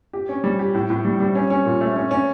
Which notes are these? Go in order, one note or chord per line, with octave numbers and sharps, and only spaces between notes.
G4
C#4
G3
G4
A2
A2
G3
G3
C#4
C#4
A#2
A3
C#4
C#4